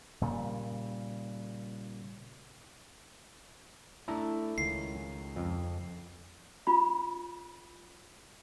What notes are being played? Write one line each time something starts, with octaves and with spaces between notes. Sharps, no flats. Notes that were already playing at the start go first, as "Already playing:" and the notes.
A#2 C#3 G3
A3 D4 E4 A5 A#5
C#2 D#3 C#4 C7
F2
F4 B5